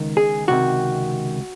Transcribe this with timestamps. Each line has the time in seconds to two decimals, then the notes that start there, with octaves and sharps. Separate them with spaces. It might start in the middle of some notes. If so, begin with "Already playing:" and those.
Already playing: C#2 D#3
0.17 G#4
0.48 C#2 C3 D#3 F#4